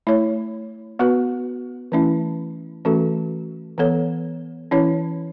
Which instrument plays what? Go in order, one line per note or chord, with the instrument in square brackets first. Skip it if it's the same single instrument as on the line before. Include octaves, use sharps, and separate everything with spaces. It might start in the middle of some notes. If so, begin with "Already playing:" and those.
[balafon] A3 E4 C#5
B3 F#4 B4
E3 A3 C#4 E4
E3 A3 C#4 F#4 A4
E3 B3 A4 C#5
E3 C#4 E4 C#5